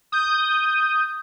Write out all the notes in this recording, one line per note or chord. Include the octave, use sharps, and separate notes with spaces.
D#6 G6